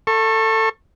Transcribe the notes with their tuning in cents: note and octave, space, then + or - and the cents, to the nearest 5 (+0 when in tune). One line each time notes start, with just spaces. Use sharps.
A4 +20 C#6 -25